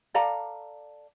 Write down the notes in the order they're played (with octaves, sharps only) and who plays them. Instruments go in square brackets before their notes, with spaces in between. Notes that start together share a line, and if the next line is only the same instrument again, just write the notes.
[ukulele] A4 D5 F5 A#5